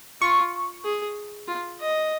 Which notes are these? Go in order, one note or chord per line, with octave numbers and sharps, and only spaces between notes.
F4 C#6
G#4
F4
D#5